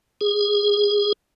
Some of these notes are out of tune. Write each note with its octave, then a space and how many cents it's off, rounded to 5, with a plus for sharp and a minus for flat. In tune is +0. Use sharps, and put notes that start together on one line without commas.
G#4 -15